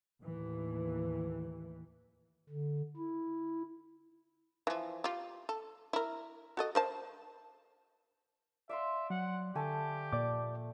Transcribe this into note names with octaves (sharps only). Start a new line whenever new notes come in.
D#2 A2 E3
D3
E4
E3 F3
F4 G4
A4
E4 A#4
F#4 A4 D#5
A#4 C5 A5
D5 E5 F5 C6
F#3 F#5
D3 A3 G4 G#5 A5
A#2 D5 D6